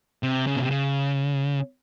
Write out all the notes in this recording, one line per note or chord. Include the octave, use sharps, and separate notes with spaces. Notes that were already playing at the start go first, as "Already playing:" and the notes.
C3
C#3
B2
C3
C#3